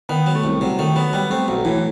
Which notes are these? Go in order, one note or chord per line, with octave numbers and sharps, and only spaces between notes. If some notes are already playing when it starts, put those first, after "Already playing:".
D#3 B3
F#3
A3
C2
C3 F#3
D#3 A3
F#3 B3
G3 B3
A3 C4
B1 F#3
A2 E3